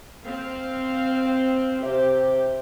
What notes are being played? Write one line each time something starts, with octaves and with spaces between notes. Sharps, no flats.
C4 F5
C3 G4